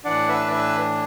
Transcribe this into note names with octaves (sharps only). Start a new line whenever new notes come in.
A2 E3 D4 D5 F#5
B4 E5
D5
B4 E5